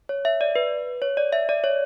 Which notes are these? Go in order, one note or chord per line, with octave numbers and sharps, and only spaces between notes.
C#5
E5
D5
B4
C#5
D5
E5
D5
C#5